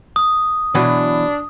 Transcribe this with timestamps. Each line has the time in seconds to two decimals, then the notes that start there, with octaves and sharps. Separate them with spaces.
0.16 D#6
0.75 B2 E3 F#3 D4